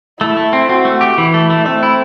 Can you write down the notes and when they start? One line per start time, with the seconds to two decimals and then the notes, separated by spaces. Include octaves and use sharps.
0.20 A3 E4
0.37 A3
0.53 C4
0.69 C4 F#4
0.85 A3
1.01 G4
1.18 E3 E4
1.34 A3
1.50 A3
1.66 A3 C4
1.83 E4